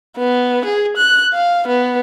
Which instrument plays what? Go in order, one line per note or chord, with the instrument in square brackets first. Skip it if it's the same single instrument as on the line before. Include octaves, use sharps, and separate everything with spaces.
[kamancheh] B3
G#4
F#6
F5
B3